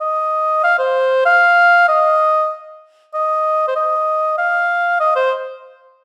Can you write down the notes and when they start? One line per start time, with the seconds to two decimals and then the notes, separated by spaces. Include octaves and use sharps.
0.01 D#5
0.64 F5
0.78 C5
1.25 F5
1.88 D#5
3.14 D#5
3.68 C5
3.76 D#5
4.38 F5
5.00 D#5
5.16 C5